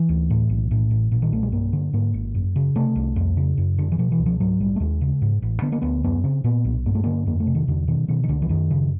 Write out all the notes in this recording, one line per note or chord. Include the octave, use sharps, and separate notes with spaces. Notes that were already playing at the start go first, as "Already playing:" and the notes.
Already playing: E3
D2
A2
B1
A2
A1
A#2
D#3
B1 A3
G#3
G2 A#3
D3
G#2 A#3
G#1
F#2
C#3
C3 A3
C2
F2
C#3
F#2
D3
E3
B2 F3
E3
C#2
F3
G#2 F#3
A#1 G3
A3
D#2 G#3
C#3
G#2
A1
D3 B3
A#3
D2 B3
F#2 B3
C#3 C4
A#2 B3
B1
G2 A#3
A3
D3 A#3
F2 A#3
A3
C3
D#3
E2 D3
B2 D#3
B2 D#3
D#3
C#2 D3
E3
F#2 D#3
C#3